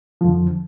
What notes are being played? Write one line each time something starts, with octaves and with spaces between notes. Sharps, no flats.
F2 D3 F3